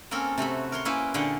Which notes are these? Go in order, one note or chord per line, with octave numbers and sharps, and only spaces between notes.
A#3 C4 C#4 A4 A#4
C3 A3 F#4 B5
A#4 C#5 C6
A#3 C#4 E4 F#4 B4 C5
A#2 D3 G#4 C#5 F#5 G5